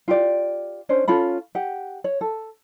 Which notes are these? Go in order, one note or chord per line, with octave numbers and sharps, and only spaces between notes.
F4 G4 D5
C#4 D4 C5
C#4 F4 A4 B5
G4 F#5
C#5
A4